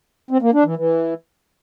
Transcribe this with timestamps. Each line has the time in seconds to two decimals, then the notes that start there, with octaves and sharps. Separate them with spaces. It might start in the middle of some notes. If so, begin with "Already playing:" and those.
0.31 C4
0.42 A#3
0.53 D4
0.65 E3
0.76 E3